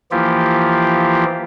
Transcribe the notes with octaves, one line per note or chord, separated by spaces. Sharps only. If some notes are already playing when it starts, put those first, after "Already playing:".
E3 F3 A#3 E4 F4 G4